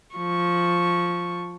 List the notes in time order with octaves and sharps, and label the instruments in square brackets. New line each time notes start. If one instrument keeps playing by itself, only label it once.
[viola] F3 C#6